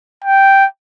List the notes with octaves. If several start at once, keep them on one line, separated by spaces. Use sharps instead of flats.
G5